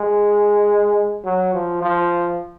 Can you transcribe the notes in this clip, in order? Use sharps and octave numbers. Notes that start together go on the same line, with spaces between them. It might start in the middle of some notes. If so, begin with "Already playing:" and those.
Already playing: G#3
F#3
F3
F3